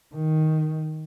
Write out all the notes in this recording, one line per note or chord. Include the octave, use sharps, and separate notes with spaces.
D#3